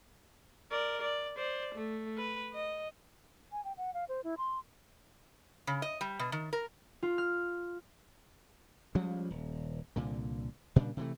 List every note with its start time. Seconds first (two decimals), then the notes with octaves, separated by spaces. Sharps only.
0.71 A#4 D5
1.02 D5
1.37 C5 D5
1.75 A3
2.17 B4
2.54 D#5
3.52 G#5
3.65 G5
3.77 F#5
3.94 F5
4.09 C5
4.24 E4
4.38 C6
5.67 C#3
5.82 D#5
6.01 G3
6.19 B2
6.32 D#3
6.53 A#4
7.03 F4
7.18 F6
8.95 F3 G3 G#3 C#4
9.30 D#1
9.96 C2 A#2 D3
10.76 A#2 C#3 G3 D4
10.97 C3 E3 A3